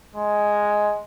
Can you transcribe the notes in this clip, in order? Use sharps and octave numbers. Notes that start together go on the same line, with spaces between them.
G#3